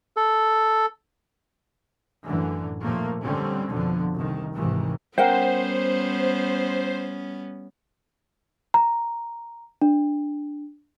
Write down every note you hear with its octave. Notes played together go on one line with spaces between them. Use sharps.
A4
F#2 A2 D3 E3
D#2 A#2 F3 A3 A#3
D3 G3 C4 C#4
F2 B2 D3 F3
C2 D#3
G#1 E2 G#2 C3 D#3 E3
G3 B3 C#4 A#4 C5 F#5 G5
A#5
D4